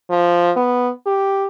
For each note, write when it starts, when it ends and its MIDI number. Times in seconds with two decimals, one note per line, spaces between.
0.10 0.51 53
0.56 0.91 59
1.06 1.47 67